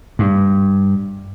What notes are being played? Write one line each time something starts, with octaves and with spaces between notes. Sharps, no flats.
G2